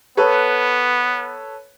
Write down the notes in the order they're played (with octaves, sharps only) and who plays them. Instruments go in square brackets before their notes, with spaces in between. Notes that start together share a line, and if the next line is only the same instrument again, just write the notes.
[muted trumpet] B3 [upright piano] A4 B4 C#5